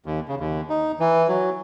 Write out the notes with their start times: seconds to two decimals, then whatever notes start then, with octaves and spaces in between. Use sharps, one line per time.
0.06 D#2
0.28 C#3
0.40 D#2
0.70 D#4
1.00 E3
1.28 F#3